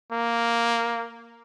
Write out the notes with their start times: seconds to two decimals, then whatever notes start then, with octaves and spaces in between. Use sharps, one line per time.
0.12 A#3